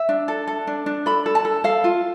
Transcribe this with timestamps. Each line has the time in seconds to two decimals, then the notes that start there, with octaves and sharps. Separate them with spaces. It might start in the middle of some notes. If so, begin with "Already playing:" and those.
Already playing: E5
0.09 D4
0.28 A4
0.48 A4
0.67 D4
0.86 D4
1.06 A4 B5
1.26 A4
1.35 A5
1.45 A4
1.64 A4 F5
1.84 F4